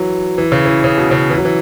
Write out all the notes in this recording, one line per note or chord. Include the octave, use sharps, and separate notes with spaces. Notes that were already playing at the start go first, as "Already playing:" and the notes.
Already playing: E3 F#3
E3
C#3
E3
C#3
B2
C#3
E3
F#3
E3